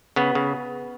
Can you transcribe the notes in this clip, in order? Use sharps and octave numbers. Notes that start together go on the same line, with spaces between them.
C#3 B3
C#3